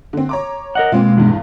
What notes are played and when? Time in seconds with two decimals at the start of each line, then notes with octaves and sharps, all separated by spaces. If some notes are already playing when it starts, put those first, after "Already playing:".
0.13 D3 C4
0.29 C#5 A#5 D6
0.75 A#4 D#5 F#5
0.92 B2 G#3 A#3 C4 F4
1.17 B1 E2 G2